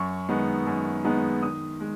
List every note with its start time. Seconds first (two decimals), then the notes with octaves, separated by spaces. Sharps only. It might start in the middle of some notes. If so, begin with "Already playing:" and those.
Already playing: F#2 C#6
0.29 D#3 G#3 B3 D#4
0.67 F#2
1.05 D#3 G#3 B3 D#4
1.42 D#3 D#6
1.80 G#3